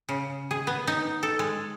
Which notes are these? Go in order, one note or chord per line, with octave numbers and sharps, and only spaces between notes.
C#3
G#4
B3
D#4
A4
G#3